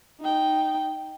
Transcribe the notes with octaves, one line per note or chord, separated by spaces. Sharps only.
D#4 G5